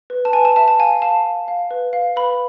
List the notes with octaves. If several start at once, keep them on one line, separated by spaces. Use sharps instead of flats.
B4
A5
B4 G#5
A5
E5 A5
A5
F5 G#5
F5 A5
F5
F5
B4
F5
B4 B5